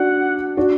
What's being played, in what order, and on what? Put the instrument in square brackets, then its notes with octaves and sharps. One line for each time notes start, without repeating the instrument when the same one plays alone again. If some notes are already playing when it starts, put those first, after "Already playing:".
Already playing: [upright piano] D4 F#4 [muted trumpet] F#5
[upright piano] D4 F#4